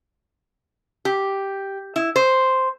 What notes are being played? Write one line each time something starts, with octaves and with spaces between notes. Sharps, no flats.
G4
E4
C5